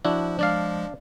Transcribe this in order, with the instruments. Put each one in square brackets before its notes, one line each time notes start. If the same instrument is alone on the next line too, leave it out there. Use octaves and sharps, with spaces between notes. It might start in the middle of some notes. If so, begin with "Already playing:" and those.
[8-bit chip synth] F3 [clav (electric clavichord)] D4 E4 F#4
[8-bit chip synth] F3 G#3 [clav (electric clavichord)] D4 D5 F5